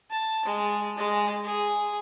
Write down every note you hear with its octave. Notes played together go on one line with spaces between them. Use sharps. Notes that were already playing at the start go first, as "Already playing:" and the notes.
A5
G#3
G#3
G#4